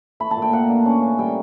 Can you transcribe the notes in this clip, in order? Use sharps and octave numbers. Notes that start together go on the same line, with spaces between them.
A3 B5
A5
A#2
G5
A#3 F#5
D4
C#4
C#4
G3 G5